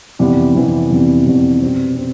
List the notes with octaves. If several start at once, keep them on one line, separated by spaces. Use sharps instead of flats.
F2 C3 E3 G3 B3
F2 C3 E3 G3 B3
F2 C3 E3 G3 B3
F2 C3 E3 G3 B3
B2 G3 C4
C4